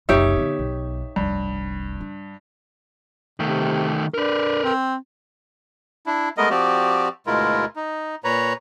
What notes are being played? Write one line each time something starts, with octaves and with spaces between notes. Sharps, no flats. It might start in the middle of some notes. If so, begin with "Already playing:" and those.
F#1 C2 D#4 G4 C#5 E5
D3 B3
B1
F1 C2 G2
D4
C3 D#3 A3
D4 A#4 B4
C4
D4 E4
G#3 A3 B3 A#4 D#5
F3 C4 F#4 G4 D5
D2 B2 G#3 E4 F4 A#4
D#4
A#2 B4 C#5 A#5